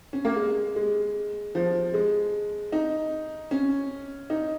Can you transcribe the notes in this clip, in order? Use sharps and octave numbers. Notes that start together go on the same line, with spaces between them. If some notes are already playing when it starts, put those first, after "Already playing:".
C#4
A#3
G#3
G#3
F3
G#3
D#4
C#4
D#4